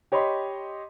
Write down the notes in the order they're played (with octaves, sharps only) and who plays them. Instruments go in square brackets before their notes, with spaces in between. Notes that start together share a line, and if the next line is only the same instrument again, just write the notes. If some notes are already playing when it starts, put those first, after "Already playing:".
[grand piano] G4 C#5 D#5 B5 C6